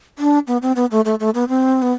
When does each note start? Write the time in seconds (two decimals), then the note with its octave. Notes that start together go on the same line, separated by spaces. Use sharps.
0.19 D4
0.47 B3
0.62 C4
0.76 B3
0.91 A3
1.05 A3
1.20 A3
1.34 B3
1.48 C4
1.82 B3